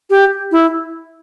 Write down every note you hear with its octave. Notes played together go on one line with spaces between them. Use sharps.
G4
E4